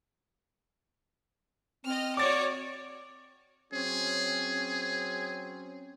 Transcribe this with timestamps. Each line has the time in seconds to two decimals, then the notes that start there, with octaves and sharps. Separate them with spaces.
1.85 C4 D#5 F6
2.17 F#4 C#5 D5 D6 A6
3.73 F#3 C4 C#4 G#4